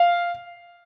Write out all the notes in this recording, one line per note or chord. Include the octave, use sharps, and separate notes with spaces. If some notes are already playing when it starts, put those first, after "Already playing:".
Already playing: F5